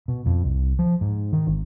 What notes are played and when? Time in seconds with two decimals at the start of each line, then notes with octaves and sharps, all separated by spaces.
0.08 B2
0.26 F2
0.44 C2
0.79 F3
1.01 G#2
1.33 D#3
1.47 G#1